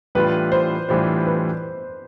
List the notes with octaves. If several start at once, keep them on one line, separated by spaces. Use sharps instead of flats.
A2 E3 G3 D4 F4 B4
C5
A2 E3 G3 D4 F4 C5
B4